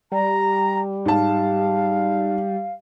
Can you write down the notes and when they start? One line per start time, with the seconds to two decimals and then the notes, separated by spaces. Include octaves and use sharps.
0.12 G3 A#5
1.06 G#2 F5 A5